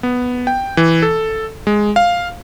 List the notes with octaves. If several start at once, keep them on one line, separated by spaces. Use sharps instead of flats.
B3
G5
E3
A4
G#3
F5